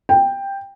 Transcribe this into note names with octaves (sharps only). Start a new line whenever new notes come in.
G5